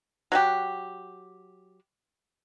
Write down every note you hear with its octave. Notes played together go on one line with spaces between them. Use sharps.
F#3 F#4 G4